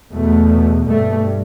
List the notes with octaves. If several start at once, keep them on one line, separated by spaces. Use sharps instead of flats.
E2 B2 A3
G2 A3